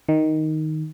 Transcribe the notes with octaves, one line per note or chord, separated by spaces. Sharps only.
D#3